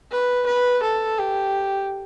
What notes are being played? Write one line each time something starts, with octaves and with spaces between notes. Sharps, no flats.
B4
B4
A4
G4